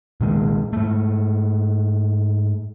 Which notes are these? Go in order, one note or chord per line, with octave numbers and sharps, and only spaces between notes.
A#2 D#3 G#3
G#2 A3